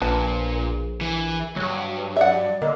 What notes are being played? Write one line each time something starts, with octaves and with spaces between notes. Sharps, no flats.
A#1 A#2 B4 A5
E3
D2 G2 F#3
D5 E5 F#5
D3 A#3 D#5